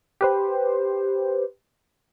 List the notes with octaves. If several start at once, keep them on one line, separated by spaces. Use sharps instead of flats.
G4 B4 C5